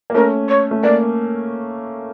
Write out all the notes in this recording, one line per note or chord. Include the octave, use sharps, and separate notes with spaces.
A#3
A3 C#4 A#4
C#5
A3
A#3 D5